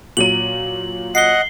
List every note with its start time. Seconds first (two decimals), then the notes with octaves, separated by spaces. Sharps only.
0.17 A#2 F#3 D#7 F#7
1.15 D#5 F#5 C7 G7